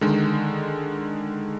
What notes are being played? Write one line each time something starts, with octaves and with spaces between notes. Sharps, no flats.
D3 D#3 G#3